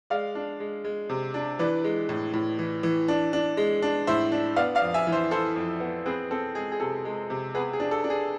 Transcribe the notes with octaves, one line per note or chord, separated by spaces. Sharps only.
G#3 D5 F5
D4
G#3
G#3
C3
D4
E3 B4 D5
G#3
A2
A2
E3
E3
D4
D4
G#3
D4
A2 C5 E5
D4
B3 D5 F5
D5 F5
F2
E5 G#5
E3
C5 E5
E4 A4 C5
F2
B3
C4 G#4 B4
C4 A4
G#3 G#4
G#4
C3 A4
G#3
C3
B3 G#4 B4
G#4
D4
A4
D4
G#4